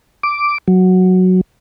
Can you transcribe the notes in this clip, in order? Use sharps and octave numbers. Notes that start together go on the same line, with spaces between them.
D6
F#3